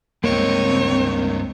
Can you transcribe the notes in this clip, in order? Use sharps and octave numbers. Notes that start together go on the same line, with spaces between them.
C#2 G2 A#3 C4 D#4 C#5